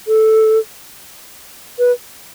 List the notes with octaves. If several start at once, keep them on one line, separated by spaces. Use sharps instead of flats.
A4
B4